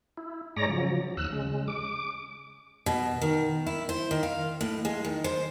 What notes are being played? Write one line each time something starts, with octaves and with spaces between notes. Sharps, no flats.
E4
G#2 G#3 C#5 D5 A#5 A#6
C#3 F3 F#3
D#2 E6 F#6
C#3 G#3
D6
B2
D#3
E4
C5
D#3
F5
A2
G#3
D#3
C5